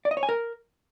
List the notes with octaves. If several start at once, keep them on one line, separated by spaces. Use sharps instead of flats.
D5
D#5
C#5
G#5
A#4